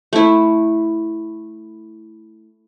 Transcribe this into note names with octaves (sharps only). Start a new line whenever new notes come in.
A3 E4